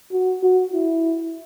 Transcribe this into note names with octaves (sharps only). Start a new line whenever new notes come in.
F#4
F#4
E4